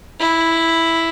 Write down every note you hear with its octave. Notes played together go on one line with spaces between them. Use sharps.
E4